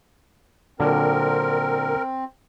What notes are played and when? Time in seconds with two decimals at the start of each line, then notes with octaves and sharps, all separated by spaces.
0.80 A#2 D3 F#3 C4 A#4